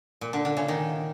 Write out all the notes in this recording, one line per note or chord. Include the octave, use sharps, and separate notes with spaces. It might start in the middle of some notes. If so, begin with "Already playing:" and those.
A#2
D3
D3
C#3
D#3